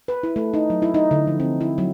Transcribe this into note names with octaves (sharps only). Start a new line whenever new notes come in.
B4
E4
A3
D#4
F#3
E4
D#4
D3
F3
C4
E4
F#3